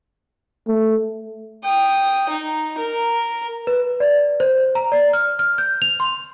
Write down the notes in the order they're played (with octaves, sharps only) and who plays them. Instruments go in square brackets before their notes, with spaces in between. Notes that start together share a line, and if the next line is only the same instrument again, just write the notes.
[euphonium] A3
[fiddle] G5 D#6
D#4
A#4
[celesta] B4
D5
C5
A#5
D5
F6
F6
G6
F7
C6